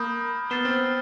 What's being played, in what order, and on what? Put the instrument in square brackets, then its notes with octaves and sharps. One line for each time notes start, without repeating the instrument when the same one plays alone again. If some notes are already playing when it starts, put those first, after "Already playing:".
Already playing: [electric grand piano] A#3 [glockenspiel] B5 D#6 G6
[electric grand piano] B3 [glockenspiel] F6 A6 C7 E7 G7
[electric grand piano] C4